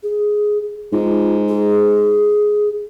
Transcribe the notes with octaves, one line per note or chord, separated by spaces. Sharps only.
G#4
G#2 F4
G#4